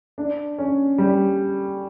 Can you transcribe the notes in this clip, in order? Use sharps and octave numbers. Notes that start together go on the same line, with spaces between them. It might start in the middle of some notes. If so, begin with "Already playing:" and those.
D4
C#4
G3